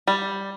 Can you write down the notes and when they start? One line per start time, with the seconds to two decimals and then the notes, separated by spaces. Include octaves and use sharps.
0.08 G3